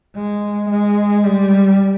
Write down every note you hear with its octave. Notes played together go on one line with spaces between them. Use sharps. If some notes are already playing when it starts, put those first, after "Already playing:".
G#3
G#3
G3